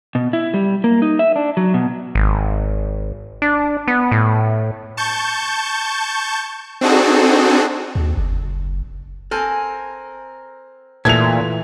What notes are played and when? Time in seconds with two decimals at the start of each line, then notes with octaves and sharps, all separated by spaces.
0.15 B2
0.33 E4
0.54 G3
0.84 A#3
1.02 D#4
1.19 E5
1.36 D4
1.57 F#3
1.74 B2
2.15 G#1
3.42 D4
3.88 B3
4.12 A2
4.97 A5 C#6 G6
6.81 C4 D4 D#4 F#4 G#4 A4
7.95 D#2
8.17 F#1
9.31 C4 A4 A#4 G#5
11.05 A#2 E3 A3 G#6 F7